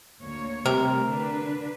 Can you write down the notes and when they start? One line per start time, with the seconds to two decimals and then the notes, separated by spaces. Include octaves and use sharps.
0.21 D2 A#3 C#5
0.66 C3 G3 A3 A#4
1.09 D3 D4 B4